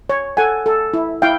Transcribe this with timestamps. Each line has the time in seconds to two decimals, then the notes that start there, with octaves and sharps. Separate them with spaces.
0.09 C#5
0.37 A4 F#5 G#5
0.66 A4
0.94 E4
1.22 E4 F5 G5